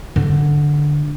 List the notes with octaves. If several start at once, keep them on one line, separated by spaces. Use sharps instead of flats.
D3